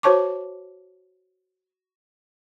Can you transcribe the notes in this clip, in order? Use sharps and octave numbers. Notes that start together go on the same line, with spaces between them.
F#4 C5 C#5 A5 C#6 D6